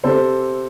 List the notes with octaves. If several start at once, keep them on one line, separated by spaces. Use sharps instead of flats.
C3 A4 C5